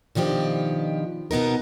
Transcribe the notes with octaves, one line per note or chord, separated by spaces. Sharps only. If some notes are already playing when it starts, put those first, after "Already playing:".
B2 D#3 F3 D4 G4
B2 B3 D#4 A#4